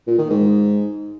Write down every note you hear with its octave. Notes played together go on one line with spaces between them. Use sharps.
A#2
D#3
G#2